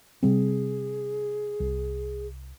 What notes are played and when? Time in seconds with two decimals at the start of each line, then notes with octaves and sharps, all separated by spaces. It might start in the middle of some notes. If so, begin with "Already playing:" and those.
0.23 C3 G3 C4 G#4
1.60 C2